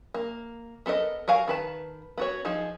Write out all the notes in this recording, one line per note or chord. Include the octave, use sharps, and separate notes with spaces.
A#3
B3 A4 A#4 D#5
F#4 A#4 F5 G#5
D#3 B4 A5
B3 F#4 C#5
F3 D#4 G#4